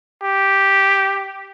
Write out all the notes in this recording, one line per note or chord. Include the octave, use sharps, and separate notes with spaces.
G4